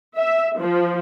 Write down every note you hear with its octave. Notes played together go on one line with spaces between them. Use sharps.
E5
F3